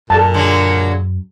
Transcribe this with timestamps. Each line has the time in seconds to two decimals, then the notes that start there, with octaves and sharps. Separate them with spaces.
0.10 F#2 A#2 A4 A5
0.34 D3 F#3 G#3